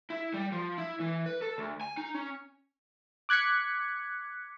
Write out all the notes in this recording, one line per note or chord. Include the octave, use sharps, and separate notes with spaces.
E4
G3
F3
E4
E3
B4
A4
D2
G#5
D#4
C#4
D6 F#6 G#6 B6 C#7